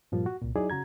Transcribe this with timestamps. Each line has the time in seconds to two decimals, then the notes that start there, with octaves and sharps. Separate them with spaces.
0.12 G2 A#2 F3 G3 A#3 F4
0.26 F#4
0.41 C2 A#2
0.56 F#3 D#4 E4 G#4 D5
0.70 C#3 F#4 A#5 G#6